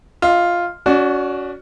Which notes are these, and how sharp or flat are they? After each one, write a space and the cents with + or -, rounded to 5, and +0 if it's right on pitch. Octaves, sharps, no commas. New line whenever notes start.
F4 +0 D#5 +25
C#4 +35 F#4 +0 D5 +10